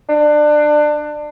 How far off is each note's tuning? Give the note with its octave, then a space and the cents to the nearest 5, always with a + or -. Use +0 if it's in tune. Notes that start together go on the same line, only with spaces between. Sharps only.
D4 +25